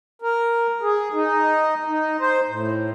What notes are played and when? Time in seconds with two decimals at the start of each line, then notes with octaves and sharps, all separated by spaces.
0.22 A#4
0.82 G#4
1.13 D#4
1.87 D#4
2.20 C5
2.49 A2